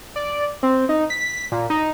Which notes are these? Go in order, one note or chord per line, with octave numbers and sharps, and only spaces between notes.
D5
C4
D#4
B6
A#2
D#4